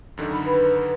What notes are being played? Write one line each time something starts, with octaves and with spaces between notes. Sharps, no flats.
F#2 D3 D#3
B5
B4